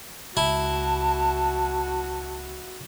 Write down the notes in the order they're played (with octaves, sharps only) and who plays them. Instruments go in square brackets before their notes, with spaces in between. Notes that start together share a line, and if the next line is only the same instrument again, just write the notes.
[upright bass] C#2 [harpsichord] E4 [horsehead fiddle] F#4 [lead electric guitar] A5